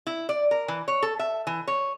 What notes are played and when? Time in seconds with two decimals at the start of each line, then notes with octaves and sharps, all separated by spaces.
0.07 E4
0.29 D5
0.51 A#4
0.68 E3
0.88 C#5
1.03 A4
1.19 E5
1.47 E3
1.68 C#5